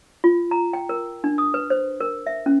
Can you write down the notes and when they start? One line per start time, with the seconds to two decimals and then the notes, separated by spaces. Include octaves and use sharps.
0.24 F4
0.51 A#5
0.73 G5
0.89 A#4
1.24 D4
1.38 D#6
1.54 B4
1.70 C5
2.00 A#4
2.27 E5
2.46 C#4